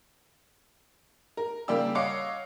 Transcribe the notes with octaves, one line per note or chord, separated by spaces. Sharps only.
A#4
C#3 G3 A#3 G4 D5 E6
C#5 D#5 F5 F#5 D6